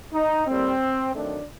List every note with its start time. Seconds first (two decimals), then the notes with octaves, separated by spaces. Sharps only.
0.13 D#4
0.47 A2 G3 A#3 C4
1.14 D#3 F#3 A3 C4 D4